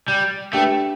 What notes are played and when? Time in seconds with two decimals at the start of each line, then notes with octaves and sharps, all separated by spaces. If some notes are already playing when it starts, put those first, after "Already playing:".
0.08 G3
0.53 A3 D4 G4 B4